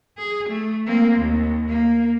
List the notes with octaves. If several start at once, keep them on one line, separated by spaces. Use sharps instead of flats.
G#4
A3
A#3 C4
D#2
A#3